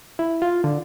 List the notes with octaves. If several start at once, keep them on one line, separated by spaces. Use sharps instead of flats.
E4
F4
D3